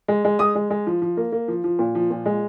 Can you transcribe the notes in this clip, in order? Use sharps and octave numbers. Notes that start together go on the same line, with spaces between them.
G#3
G#3
G#3 D#6
G#3
G#3
F3
F3
A#3
A#3
F3
F3
A#2
F3
A#2
G#3